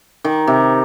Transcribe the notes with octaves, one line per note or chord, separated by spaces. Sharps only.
D#3
C3